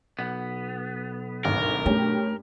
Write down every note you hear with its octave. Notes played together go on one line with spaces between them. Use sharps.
B1 B3
G#1 D2 G2 A#4
G2 A3 C#4 G4